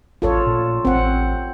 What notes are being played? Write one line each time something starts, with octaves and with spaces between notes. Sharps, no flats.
A1 F4 A4 C#5
A#2
A1 C4 F#5